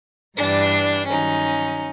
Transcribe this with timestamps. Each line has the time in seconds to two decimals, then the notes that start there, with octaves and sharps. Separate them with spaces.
0.37 G2 E3 G3 D4
1.07 G2 D#3 F#3 C#4 D#4